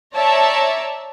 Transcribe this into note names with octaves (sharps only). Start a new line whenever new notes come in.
C#5 D5 E5 A5 A#5